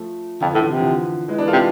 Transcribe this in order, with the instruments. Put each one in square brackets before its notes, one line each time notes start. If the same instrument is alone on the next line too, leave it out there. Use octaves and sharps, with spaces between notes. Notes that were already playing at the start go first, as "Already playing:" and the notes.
Already playing: [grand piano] F3 A3
[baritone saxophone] F2 [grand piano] D3 F3
[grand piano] E3
[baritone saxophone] A2
[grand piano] D3
[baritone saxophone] C3 [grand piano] E3
[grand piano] D3 F3
E3 G#3
B3 D4
F4 A4
[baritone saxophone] C3